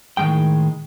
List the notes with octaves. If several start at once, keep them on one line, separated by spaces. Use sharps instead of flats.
A2 D#3 G3 G#3 G5